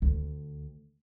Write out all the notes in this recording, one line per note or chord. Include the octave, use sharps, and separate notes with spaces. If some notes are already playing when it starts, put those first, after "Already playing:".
D2